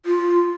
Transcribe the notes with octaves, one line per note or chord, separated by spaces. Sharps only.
F4